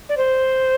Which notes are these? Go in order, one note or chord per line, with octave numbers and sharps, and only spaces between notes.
D5
C5